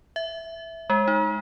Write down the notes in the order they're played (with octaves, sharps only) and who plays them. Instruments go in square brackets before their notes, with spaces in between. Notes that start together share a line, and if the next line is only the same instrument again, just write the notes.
[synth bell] E5
G#3
D#4